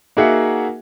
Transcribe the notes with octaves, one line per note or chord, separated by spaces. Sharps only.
A#3 D#4 F#4 G#4 E5 F#5